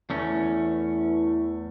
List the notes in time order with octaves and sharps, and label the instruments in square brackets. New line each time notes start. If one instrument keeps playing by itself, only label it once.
[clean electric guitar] E2 A3 C#4 [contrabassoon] E3